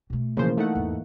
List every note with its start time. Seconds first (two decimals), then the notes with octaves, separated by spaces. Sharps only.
0.10 B2 A3
0.37 C#3 E3 F3 A#3 C5
0.57 A3 D#4 F#5
0.75 E2 G#2